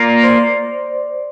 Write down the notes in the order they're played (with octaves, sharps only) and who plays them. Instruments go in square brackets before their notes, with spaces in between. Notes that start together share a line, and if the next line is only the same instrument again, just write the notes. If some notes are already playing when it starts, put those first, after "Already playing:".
Already playing: [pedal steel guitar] A#3 F4 A#4 [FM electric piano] D5
[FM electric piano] C5